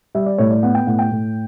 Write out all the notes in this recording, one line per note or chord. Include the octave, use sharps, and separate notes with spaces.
G3 E5
D5
A2 C#5
D5
B3 F#5
G5
A2 F#5
G5
A2